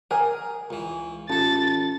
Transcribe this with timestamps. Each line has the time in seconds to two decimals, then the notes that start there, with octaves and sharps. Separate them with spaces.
0.11 G#4 A#4 G#5
0.70 C#2 E3
1.30 A1 C#4 F4 A4 A5 A6